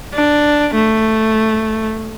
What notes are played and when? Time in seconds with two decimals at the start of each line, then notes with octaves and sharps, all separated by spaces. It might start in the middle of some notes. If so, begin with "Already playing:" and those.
0.14 D4
0.75 A3